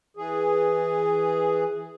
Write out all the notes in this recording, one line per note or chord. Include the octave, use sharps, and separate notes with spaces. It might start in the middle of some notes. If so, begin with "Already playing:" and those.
E3 G#4